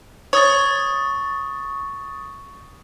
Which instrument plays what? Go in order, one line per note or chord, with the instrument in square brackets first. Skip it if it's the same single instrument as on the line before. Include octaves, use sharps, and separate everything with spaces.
[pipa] C#5 [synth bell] C#6 D#6 A6